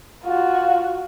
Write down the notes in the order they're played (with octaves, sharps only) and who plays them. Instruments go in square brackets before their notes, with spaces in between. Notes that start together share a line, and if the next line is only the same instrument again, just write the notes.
[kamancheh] F4 F#4